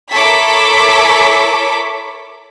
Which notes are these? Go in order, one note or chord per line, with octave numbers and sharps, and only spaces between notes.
E4 A4 A#4 C#5 D6 B6